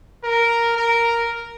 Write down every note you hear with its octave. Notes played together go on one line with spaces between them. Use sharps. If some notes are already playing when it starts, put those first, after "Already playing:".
A#4
A#4